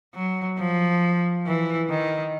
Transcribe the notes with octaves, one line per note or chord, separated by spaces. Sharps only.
F#3
F3
E3
D#3